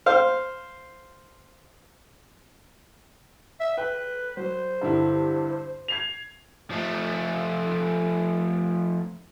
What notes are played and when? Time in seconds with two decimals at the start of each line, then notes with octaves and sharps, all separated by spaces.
0.06 C5 F5
3.60 E5
3.77 B4 G5
4.37 F#3 C5
4.81 G2 D3 E4
5.88 G#6 C7 F7
6.71 F3 A3